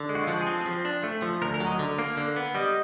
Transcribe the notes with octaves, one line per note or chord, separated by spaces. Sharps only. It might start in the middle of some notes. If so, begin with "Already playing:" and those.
Already playing: D3
G#3
F#4
F4
F3 F#4
G#4
C4
A4
F3
D4
A3
F3
D2 A#4
A#4
F#3
D#5
D3
A#3
D3
B3
G3 D#5